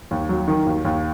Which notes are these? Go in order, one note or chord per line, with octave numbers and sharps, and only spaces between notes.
D#2
F#3
D#3
D#2
D#2